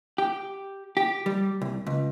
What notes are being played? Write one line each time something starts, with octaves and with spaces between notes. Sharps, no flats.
G4
G4
G3
C2
C#2